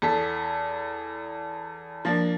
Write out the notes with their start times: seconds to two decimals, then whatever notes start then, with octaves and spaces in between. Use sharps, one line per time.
0.02 E2 A4 B6
2.05 F3 A#3 D4